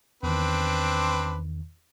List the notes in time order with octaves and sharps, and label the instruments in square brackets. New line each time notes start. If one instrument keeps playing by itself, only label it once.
[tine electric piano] E2 D#3 [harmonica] C4 D4 B4